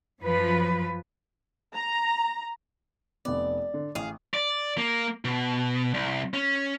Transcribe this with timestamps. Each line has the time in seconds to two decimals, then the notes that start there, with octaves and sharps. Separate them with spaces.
0.23 F#2 F3 B4
1.74 A#5
3.25 F1 B3 D5
3.74 D3
3.95 A1 G#4 F5
4.34 D5
4.78 A#3
5.25 B2
5.94 C2
6.34 C#4